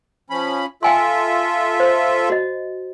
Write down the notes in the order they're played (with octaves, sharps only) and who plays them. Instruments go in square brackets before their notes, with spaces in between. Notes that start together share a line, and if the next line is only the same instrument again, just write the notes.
[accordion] F3 C#4 B5
[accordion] F4 A4 E5 [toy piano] G5 G#5 C6
[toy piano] C5
F#4 D#5